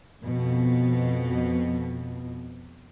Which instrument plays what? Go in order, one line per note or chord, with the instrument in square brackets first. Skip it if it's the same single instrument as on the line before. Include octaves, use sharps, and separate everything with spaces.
[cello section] F2 B2